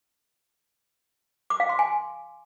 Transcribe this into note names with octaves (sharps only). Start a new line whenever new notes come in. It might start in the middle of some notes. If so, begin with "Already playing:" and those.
D6
F5
C6
G#5